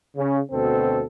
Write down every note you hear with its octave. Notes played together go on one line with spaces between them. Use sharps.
C#3
D2 B2 C4 A4